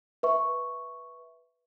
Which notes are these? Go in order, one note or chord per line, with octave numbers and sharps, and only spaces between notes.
B4 E5 C#6